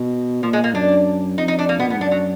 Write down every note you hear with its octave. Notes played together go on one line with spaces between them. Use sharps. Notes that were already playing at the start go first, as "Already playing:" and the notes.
Already playing: B2
A#2 F3
G#3
A#3
F#2 D4
F2 D#4
D#4
D4
A#3
B2 B3
A#2
B3
G#2
F#2 D4
F#3